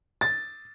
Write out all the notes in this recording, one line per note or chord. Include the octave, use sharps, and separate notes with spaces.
A6